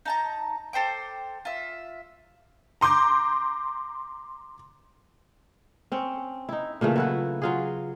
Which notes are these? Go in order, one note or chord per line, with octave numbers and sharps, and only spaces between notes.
D#4 A5 A#5
A4 C5 G5 D6
F4 E5
A#5 C6 D6 G6
C4 C#4
D#4 E4
A#2 C#3 E3 A3
F#3 E4 B4
F#3 F4 G#4